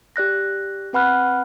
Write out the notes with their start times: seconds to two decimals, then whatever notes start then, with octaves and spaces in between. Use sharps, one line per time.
0.16 G4 D5 F#6 A#6
0.93 C4 B4 F#5 B5 F6 F#6